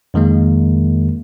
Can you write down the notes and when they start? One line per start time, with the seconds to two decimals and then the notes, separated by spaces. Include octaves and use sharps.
0.14 F2 D#3 G#3 A#3